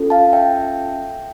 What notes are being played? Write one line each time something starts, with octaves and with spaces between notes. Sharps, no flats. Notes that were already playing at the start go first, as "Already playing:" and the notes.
Already playing: C#4 F4 A4
F5 A5
E5 G5